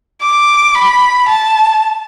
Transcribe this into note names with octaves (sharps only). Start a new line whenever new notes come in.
D6
B5
A5